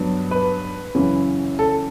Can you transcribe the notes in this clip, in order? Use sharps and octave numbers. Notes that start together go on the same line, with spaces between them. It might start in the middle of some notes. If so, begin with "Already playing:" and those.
Already playing: G2 F#3 B3 D4
B4
F#2 C#3 E3
A4